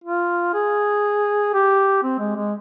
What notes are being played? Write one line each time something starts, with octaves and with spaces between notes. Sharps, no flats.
F4
G#4
G4
C4
G#3
G#3